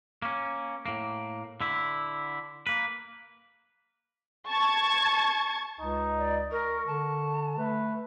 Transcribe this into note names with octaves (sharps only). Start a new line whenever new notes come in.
A#3 C#4
A2 A#3
D3 E4
A#3 B4
A5 C#6 G#6
C#2 D#4
D5
A#4 C#6
D3 A5
A3 B4